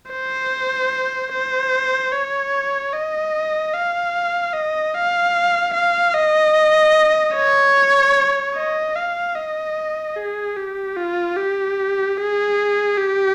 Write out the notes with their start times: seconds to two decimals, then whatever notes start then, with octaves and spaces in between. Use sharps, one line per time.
0.11 C5
1.33 C5
2.12 C#5
2.93 D#5
3.73 F5
4.53 D#5
4.94 F5
5.74 F5
6.14 D#5
7.35 C#5
8.55 D#5
8.96 F5
9.36 D#5
10.16 G#4
10.57 G4
10.97 F4
11.36 G4
12.17 G#4
12.98 G4